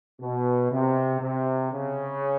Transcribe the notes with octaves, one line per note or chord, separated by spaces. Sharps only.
B2
C3
C3
C#3